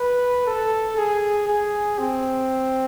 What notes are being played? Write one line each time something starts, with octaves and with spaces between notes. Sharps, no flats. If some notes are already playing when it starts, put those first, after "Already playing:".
Already playing: B4
A4
G#4
G#4
C4